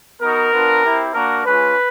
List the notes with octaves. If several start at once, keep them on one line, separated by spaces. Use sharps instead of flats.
B3 D#4 F#4 A#4
B3 D4 F4
C4 E4 G4
A#3 D4 F#4 A#4
G#3 C#4 F4 B4